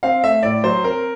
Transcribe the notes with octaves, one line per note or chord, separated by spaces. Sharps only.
C4 F5
A3 E5
A2 D5
F#3 C5
C4 A#4